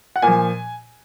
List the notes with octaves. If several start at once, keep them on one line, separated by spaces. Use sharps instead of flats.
F#5
A#2 F3 G#5